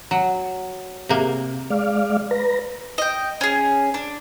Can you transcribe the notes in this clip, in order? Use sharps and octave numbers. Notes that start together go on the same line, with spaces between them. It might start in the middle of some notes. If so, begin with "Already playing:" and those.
F#3
C3 A#3
G#3 D5 F5
B4 A#5
D#5 G5
C#4 G#4
D4